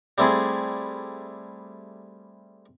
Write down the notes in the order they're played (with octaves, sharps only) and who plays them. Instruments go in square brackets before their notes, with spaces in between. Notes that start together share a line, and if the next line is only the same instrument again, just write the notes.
[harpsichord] G3 A3 C4 E4 G#4